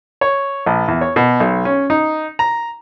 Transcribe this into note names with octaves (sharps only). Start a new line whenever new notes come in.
C#5
A#1
E2
C#5
B2
B1
C#4
D#4
A#5